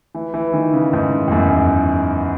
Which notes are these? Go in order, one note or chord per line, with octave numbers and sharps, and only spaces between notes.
E3
E3
D#3
C#3
G#2
E2
F#2